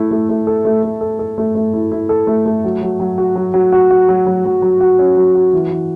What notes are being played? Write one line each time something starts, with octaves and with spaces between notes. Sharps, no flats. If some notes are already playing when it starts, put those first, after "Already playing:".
Already playing: A3 E4
A3
A3
A4
A3
A3
A4
A4
A3
A3
E4
E4
A4
A3
A3
F#3
F#3
F#3
F#4
F#3
F#3
F#4
F#4
F#3
F#3
F#3
F#3
F#4
C#4
F#3
F#4
E3
E3